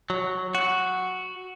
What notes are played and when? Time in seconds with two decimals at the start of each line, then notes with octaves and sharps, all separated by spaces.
0.10 F#3
0.55 F#4